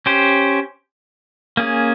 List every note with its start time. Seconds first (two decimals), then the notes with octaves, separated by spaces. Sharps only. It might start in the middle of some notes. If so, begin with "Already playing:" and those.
0.06 C#4 G4 C5
1.57 A#3 C#4 G#4